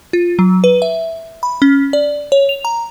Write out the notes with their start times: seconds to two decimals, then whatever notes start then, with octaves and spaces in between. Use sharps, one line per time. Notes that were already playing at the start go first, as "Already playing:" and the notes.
0.13 F4
0.39 F#3
0.64 B4
0.82 E5
1.43 B5
1.62 C#4
1.93 D5
2.32 C#5
2.49 F7
2.65 A#5